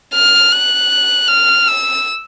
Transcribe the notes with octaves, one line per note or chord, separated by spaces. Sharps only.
F6
F#6
F6
E6